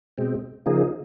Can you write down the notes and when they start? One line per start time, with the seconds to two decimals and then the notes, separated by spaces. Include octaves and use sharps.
0.18 B2 G#3 C4
0.66 C#3 F3 A#3 D#4 G#4